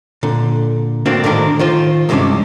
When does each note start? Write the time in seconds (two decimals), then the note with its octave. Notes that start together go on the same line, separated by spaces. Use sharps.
0.23 A#2 D3
1.05 A2 D3 A#3 C4 D4 F#4
1.24 A2 D3 D#3 D4 A#4
1.59 D#3 F4 C5
2.09 E2 G2 C3 G#3 C#4 D4